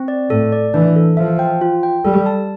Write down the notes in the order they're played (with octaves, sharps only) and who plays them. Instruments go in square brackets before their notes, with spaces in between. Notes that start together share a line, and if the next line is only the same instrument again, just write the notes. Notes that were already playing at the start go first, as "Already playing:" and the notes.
Already playing: [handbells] C4
D5
[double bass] A2 [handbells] A4
[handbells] D5
[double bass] E3 [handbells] D4
[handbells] A4
[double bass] F3 [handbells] E5
[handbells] G5
F4
G5
[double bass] G3 [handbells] A4
[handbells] A5